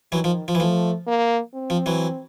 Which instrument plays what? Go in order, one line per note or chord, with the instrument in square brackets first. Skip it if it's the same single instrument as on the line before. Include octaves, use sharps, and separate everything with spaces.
[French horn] D#3 [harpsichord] E3 F#3
[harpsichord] F3
F3
E3
[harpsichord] F3 [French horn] A3
[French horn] A#3
C4
[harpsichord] F3
E3 F#3